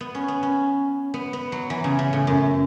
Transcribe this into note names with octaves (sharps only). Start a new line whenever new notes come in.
B3
C#4
B3
C#4
B3
B3
F#3
E3
C#3
C#3
A2
F#2